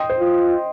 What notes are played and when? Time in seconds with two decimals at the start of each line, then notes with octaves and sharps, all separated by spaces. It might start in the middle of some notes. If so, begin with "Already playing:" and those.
Already playing: D#5 G5 C6 D#6
0.10 C5
0.19 F4